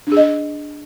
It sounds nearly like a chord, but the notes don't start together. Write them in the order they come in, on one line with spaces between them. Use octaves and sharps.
D4 G#4 D#5